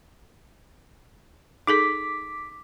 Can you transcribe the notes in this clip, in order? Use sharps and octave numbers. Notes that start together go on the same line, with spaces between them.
D#4 G#4 A4 D6 B6